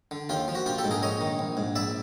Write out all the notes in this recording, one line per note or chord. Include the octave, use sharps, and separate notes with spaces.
D3
D#2 F4 G4
F3
F#4
A#1 F4 G4
G4 A4
G#2
G#4 A#4
A#1 C#5 D#5
D#3
A#1
G#2
A#1 D5 E5